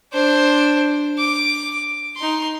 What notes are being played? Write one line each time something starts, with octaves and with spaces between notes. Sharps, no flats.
D4 C5
D6
D#4 C6